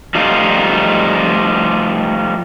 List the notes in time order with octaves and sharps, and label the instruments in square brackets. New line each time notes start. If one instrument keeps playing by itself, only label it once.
[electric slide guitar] F3 G3 A3 D#4 F4